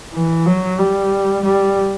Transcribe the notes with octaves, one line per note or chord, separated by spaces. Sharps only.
E3
F#3
G3
G3